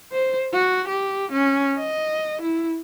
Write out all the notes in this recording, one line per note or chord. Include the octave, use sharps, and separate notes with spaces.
C5
F#4
G4
C#4
D#5
E4